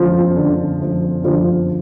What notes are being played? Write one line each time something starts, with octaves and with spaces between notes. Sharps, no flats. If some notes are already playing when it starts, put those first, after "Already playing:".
Already playing: D3 F3 F4
D3
F3
D3 F3 F4